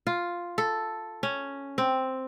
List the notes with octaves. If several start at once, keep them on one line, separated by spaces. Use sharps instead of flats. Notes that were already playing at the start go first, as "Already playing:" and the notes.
F4
A4
C#4
C4